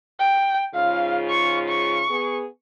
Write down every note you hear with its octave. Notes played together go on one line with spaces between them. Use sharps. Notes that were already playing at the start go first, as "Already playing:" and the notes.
G5
G#2 C#3 F4 F5
C#6
C#6
B3 G#4